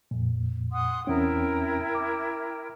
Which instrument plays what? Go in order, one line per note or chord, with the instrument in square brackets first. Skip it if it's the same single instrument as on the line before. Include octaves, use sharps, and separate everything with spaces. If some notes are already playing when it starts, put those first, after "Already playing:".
[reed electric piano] F2 A#2
[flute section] F#5 C6 D#6
[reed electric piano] E2 C4 C#4 [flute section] E4 A#4 G5
[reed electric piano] D6